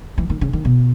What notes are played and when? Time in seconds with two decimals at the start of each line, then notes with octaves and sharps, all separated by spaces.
0.18 E3
0.30 D#3
0.41 C#3
0.53 D#3
0.65 B2